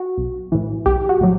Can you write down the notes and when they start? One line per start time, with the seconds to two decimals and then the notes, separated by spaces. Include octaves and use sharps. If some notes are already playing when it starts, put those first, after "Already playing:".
Already playing: F#4
0.17 B1
0.52 A2 E3
0.86 B1 G4
1.09 F#4
1.21 A2 F#3